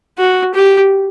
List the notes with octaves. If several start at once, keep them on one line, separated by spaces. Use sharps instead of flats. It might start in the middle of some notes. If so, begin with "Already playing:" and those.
F#4
G4